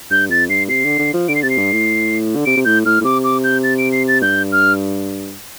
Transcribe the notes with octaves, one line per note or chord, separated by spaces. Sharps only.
G2 G6
F2 A6
G2 C7
C3 C7
D3
D3
F3
D3 D7
C7
C3 A6
C7
G2
A2
D3
C3 D7
C3
A2 G6
A2 F6
A2
C3 D6
D6
G6
A6
D7
C7
A6
G2 G6
F6